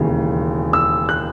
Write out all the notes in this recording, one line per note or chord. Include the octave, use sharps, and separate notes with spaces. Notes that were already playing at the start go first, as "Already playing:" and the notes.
Already playing: E1 D#2 C#3 E3
E6
F#6